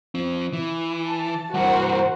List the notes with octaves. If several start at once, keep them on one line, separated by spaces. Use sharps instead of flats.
F3 C4
E3
A5
G2 E3 F#4 A#4 C5